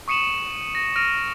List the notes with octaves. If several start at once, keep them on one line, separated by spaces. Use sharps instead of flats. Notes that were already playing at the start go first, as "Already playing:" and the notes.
C#6 D#6 C#7 D#7 E7 F#7
A#6
F6 A#6 D7 D#7 F7